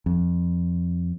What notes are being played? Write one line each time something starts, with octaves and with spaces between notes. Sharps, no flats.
F2